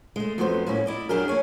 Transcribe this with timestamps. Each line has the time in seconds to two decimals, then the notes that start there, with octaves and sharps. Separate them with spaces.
0.16 G#3 A3
0.38 F2 F#3 A3 B3 C#4 C5
0.67 A2 G3 A#3 C#4 E4
0.86 E4 D5 D#5
1.09 F#2 F#3 D4 G4 G#4 A#4
1.28 A#3 G#4 C#5 G#5